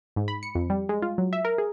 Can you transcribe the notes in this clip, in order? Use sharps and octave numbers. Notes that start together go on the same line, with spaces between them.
G#2
B5
C#7
F2
G3
G#3
F4
F#3
E5
A#4
G#4